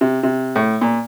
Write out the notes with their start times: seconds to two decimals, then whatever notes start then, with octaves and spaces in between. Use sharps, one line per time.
0.01 C3
0.23 C3
0.56 A2
0.81 A#2